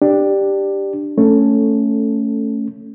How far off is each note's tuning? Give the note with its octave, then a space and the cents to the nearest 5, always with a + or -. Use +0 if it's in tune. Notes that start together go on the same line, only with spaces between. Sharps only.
D4 +10 G4 +0
A3 +10 C#4 +0 A4 +0